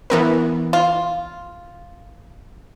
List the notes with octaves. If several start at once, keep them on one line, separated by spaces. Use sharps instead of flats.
E3 B3 A#4
F4